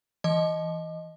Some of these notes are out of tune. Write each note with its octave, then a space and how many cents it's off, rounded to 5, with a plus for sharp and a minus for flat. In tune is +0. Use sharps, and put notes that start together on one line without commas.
E3 +5 D#5 +0